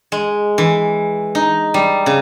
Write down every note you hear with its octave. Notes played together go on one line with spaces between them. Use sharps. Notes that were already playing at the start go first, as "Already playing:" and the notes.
G#3
E3
D#4
G3
C#3